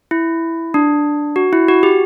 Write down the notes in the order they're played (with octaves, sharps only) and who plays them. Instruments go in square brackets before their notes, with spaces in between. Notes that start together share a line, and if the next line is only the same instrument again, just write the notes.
[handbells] E4
D4
F#4
E4
F#4
G4